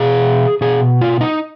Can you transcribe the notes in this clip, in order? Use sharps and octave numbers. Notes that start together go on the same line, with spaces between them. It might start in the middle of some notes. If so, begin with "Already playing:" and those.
Already playing: B2 G#4
B2 G#4
F4
D#4